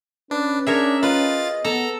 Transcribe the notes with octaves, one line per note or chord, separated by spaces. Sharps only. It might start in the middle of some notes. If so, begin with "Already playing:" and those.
C#4 D4 B4
D4 G#4 A#4 C#5 E5
F4 B4 D#5 A6
B3 A4 A#5